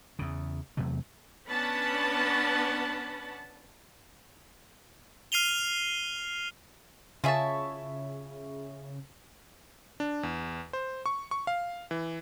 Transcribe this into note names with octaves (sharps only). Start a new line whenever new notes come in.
E2 C#3
E2 C3 F#3 A3
B3 C#4 D4 F#5 A5 B5
F6 C7 D#7 F7 G7
C#3 E4 F4 G#4 C#5 E5 A5
D4
E2
C5
C#6
C#6
F5
E3